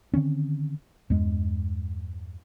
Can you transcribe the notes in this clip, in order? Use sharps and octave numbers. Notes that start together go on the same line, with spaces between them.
D3 D#3 C4 C#4
E2 G2 G#3